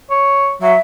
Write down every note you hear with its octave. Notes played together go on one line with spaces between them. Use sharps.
C#5
F#3 E5